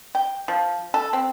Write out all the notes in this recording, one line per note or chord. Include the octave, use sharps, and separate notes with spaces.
G5
F3
A4
C4